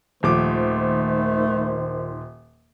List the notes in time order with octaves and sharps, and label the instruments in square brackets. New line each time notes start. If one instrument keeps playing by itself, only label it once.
[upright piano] D#1 F3 D6 [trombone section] D#3 C5 [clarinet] A3